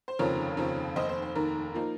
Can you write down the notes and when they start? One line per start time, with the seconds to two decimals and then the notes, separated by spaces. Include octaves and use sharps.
0.08 C5
0.19 F1 D#2 C#3 F3 C4 A#4 C#5
0.57 F1 D#2 C#3 F3 C4
0.96 F1 D#2 D#3 C5 D#5
1.09 C5
1.22 C5
1.35 F1 D#2 D#3 A#4
1.74 F3 A#3 D#4